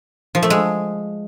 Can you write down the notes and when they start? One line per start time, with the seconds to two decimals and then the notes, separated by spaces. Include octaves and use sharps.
0.35 F3
0.43 A3
0.50 G#3